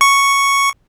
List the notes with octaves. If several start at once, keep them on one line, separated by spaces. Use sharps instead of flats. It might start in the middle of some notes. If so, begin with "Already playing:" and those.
C#6